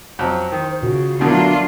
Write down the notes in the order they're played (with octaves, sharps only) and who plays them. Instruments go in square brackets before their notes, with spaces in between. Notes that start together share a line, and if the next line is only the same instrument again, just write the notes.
[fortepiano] F2 F#3 [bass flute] C5
[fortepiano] D#3
[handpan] A#2 [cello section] C#3 [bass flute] F#4
[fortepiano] B2 D3 [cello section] F#3 D4 F4 [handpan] A3 A#4